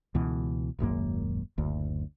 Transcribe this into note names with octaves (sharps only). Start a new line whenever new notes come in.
C#2 B2 E3
D#1 G#1 F#2 A#3
F#1 D2